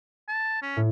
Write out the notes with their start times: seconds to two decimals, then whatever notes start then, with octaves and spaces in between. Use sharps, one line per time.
0.28 A5
0.62 C#4
0.77 A2